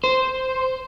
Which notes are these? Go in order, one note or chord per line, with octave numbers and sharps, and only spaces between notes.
C5